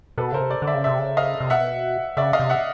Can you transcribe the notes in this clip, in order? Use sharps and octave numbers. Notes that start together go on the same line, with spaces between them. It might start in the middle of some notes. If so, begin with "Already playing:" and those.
B2 A4 B4
C#3 A#4 C5
C3
C5 D5
D3
D5 E5
C#3
C3 D5 E5
C#3
D#5 F5
C3
B2 E5 F#5
C#3 D5 E5
D#5 F5
C3
E5 F#5